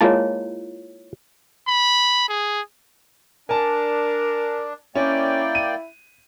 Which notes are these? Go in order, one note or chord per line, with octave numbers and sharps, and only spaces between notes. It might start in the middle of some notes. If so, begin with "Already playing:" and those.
G#3 A#3 E4 F4 C#5 A5
B5
G#4
D4 A#4 G#5 A5
A#3 C#4 E4 D5 G5
D#7